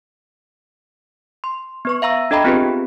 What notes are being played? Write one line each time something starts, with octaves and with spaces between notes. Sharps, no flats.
C6
B3 B4 C#6
E5 F5 A#5 E6
D4 A4 D#5 G5 A#5 B5
B3 C4 F4 G4 G#4 B4